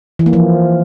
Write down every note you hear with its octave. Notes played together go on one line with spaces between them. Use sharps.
E3
A#3
F3